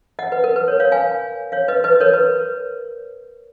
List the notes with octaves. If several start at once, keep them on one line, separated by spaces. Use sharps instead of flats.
D#5 F#5
B4
A#4
B4
A#4 C#5
C#5 F5
F5 G#5
C#5 F5
B4 D#5
B4 D#5
A#4 C#5
B4